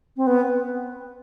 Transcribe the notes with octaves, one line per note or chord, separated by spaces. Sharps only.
C4
B3